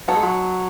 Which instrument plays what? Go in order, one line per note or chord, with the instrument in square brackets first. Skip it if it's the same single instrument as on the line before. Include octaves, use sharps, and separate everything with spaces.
[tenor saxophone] F#3 [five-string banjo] B3 D#4 A4 C#5
[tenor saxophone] G#3
F#3